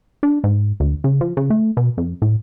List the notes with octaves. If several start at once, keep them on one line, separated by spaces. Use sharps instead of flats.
D4
G#2
D2
C#3
F3
C#3
A3
B2
F2
A2